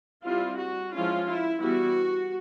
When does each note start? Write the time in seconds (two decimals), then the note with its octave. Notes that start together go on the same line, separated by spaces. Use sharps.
0.24 G3 C4 E4 F4
0.59 F#4
0.93 F3 G#3 C#4 E4 F4
1.27 E4
1.61 E3 G3 B3 E4 F#4